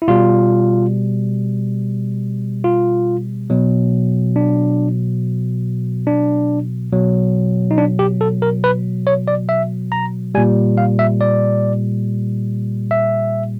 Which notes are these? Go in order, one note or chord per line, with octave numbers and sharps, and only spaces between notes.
E4
B2 G3 F4
F4
B2 F#3
D4
D4
B2 F#3
D#4
D4
G4
A4
A#4
B4
C#5
D5
E5
A#5
A#2 G3 G#5
F5
E5
D5
E5